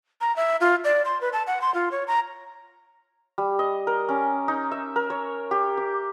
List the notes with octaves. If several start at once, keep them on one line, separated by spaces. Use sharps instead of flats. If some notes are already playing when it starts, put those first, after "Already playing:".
A#5
E5
F4
D5
C6
B4
A5
F#5
C6
F4
C#5
A#5
G3
D#5
A#4
C#4
D#4
E5
A#4
C#5
G4
D6